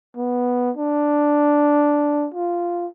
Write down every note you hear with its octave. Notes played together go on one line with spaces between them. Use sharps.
B3
D4
F4